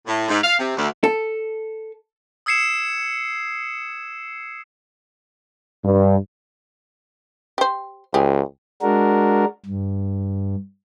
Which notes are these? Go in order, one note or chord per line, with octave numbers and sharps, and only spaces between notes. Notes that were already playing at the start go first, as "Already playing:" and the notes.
A2
G#2
F5
C3
D2
A4
D#6 E6 G#6 C7 C#7 E7
G2
G4 C5
C#2 G4 G#4
G#3 D4 F#4 A#4
G2